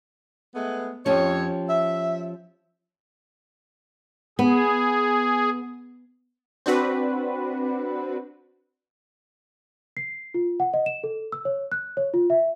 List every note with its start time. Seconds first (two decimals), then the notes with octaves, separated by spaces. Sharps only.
0.54 G#3 A3 B3
1.06 F2 F3 C#4 G4 C#5
1.68 E5
4.39 B3 G#4
6.66 C4 D4 F#4 B4
9.97 C7
10.34 F4
10.60 F#5
10.74 D#5
10.86 E7
11.03 A4
11.32 E6
11.45 C#5
11.72 F#6
11.97 C#5
12.14 F4
12.30 E5